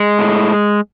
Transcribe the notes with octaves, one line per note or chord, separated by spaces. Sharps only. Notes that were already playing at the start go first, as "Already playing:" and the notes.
Already playing: G#3
A2